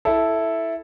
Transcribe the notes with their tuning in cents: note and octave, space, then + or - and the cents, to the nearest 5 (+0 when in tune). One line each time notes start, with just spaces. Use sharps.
E4 +0 A4 -5